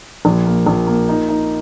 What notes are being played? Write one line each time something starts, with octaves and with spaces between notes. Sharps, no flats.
A#1
A#3
A#1
A#3
D#4
D#4